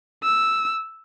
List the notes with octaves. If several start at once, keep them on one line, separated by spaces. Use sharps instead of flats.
E6